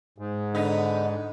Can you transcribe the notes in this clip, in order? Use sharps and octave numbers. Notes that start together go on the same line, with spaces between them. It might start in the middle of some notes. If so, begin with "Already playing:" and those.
G#2
D3 B3 D#4